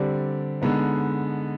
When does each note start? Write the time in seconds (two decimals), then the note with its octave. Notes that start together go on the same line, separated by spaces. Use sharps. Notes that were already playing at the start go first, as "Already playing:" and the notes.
Already playing: D3 G3 C4 G4 D5
0.62 D3 G#3 B3 D#4